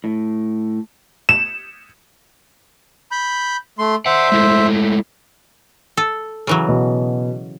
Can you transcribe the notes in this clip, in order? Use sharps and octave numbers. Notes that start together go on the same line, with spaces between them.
A2
E7
B5 G6
A3 C6
C5 D5 E5 F#5
G#3 A3 E4
A4
C#3 E3 F#3
B2